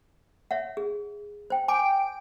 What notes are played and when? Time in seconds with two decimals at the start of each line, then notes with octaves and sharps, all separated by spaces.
0.51 C#5 E5 F#5
0.77 G#4
1.50 C5 G5
1.68 G5 G#5 D6 D7